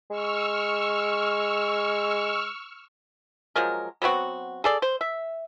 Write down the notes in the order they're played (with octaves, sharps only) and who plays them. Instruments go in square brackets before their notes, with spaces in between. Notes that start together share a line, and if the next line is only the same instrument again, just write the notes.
[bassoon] G#3 [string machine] C#6 E6 F6
[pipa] F3 F#3 G#3 A#4
F#3 B3 C4 F#4
G#4 A4 D5
C5
E5